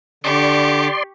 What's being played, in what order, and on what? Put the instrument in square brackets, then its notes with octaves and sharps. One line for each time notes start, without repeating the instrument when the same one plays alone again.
[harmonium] D3 [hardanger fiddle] G4 C#6 [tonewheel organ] D5 C6